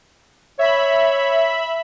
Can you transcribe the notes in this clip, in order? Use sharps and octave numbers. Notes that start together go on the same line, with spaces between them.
C#5 E5 B5